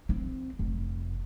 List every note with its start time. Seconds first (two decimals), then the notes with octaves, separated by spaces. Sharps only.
0.09 C4
0.59 F1